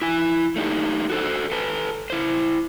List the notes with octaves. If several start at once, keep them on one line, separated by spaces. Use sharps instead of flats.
E4 G#5
A3 D4 D#4 G4
F#4 A4 C5
A4 B4 A5
E4 C5